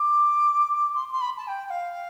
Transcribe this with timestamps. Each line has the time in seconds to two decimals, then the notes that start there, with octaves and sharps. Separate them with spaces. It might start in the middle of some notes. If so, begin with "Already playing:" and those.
Already playing: D6
0.95 C6
1.12 C6
1.20 B5
1.37 A5
1.47 G5
1.65 G5
1.70 F5